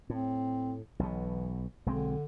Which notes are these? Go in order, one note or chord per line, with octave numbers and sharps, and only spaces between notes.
A2 C4
B1 B2 E3
B1 D3 G#3 C4